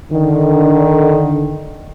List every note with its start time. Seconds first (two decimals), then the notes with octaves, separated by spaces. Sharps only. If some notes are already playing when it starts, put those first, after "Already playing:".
0.11 D3 D#3